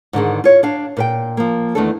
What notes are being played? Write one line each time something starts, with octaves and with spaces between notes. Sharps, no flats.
G#2 D3 D#3 G#3
F4 C#5
D4 F5
A#2 B4 G5
F3 A#3
E2 D#3 A3 C4 D4 A4